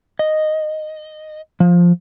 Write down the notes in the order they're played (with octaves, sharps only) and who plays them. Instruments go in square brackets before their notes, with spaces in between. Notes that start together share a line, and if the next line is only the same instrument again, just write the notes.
[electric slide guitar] D#5
F3